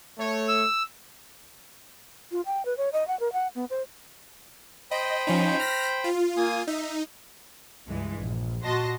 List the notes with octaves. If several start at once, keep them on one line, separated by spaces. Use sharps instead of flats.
A3 C#5
E6
F4
G5
B4
C#5
D#5
F#5
A#4
F#5
B3
C5
C5 D#5 G5 B5
F3 C#4 D#4
F6 A#6 B6
F4
A#3 G#5 D#6
D#4 E5
C#2 G2 E3 G#3
A#1
A#2 F#4 D#5 A5 C6 A#6